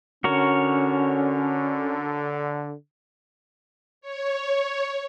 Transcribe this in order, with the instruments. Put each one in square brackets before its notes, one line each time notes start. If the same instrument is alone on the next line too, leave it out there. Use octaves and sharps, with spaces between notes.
[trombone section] D3 [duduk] C#4 [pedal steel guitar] F#4 A#4 C#5
[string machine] C#5